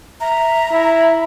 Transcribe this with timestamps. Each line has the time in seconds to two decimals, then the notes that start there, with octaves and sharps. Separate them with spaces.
0.21 E5 A#5
0.71 E4